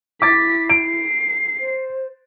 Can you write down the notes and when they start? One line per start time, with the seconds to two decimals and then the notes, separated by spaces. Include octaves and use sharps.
0.22 E4 D6 A6 B6
0.70 C7 D7
1.60 C5